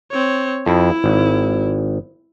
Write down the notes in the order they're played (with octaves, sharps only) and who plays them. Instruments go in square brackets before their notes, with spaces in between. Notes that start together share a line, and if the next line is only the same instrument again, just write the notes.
[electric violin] C4 C#5
[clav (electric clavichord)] F2 [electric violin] E4
[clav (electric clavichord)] G#1